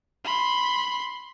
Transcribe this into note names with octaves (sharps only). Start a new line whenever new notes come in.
B5 C6